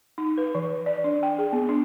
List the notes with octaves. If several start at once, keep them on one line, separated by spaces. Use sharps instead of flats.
D#4
B4
E3
D5
D4
G5
G#4
B3
D4